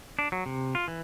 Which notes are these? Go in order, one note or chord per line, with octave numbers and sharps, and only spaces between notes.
D4
F#3
C3
F4
E3